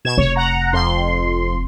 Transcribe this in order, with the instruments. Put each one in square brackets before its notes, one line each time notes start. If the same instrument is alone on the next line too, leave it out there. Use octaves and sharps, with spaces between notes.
[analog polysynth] B2 G#6 E7
[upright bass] F1 [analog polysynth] C#5
[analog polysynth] F#5 A#5
F2 C6